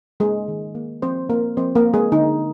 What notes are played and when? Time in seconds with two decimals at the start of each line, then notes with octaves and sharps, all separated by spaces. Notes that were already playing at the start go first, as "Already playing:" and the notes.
0.20 G#3 A#3 G#4
0.48 D#3
0.75 A#3
1.02 F3 C4 C5
1.29 A#3 C4 A#4
1.57 F3 C4 C5
1.75 A#3 A#4
1.85 C4
1.94 G#3 G#4
2.12 D3 D#4